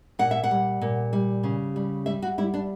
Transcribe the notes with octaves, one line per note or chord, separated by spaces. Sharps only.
A#2 F#5
E5
F#5
G3
A#2
G3
C#3
G3
G3 E5
F#4
G3 E4
D4